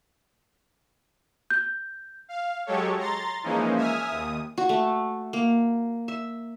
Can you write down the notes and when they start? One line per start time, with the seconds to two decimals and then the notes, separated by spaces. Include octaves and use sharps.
1.50 G6
2.29 F5
2.66 F#3 G#3 G4 A4 C#5
2.97 A#5 C6 A6
3.43 E3 F3 G#3 A#3 C#4 D#4
3.76 E5 G#5 D#6 F6
4.08 D#2 D#6
4.58 F#4
4.69 A3
5.33 A#3
6.08 E5